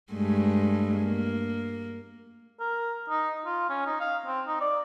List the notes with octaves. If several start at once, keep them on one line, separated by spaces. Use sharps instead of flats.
G2 G#3 A3
A#3
A#4
D#4
F4
C#4
D#4
F5
C4
D#4
D5